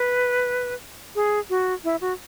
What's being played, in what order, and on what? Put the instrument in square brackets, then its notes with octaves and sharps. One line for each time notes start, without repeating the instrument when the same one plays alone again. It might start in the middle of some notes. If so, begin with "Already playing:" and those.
Already playing: [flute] B4
G#4
F#4
E4
F#4